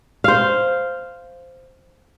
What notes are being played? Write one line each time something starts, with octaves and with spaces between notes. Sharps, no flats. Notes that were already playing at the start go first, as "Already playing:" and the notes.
C5 F5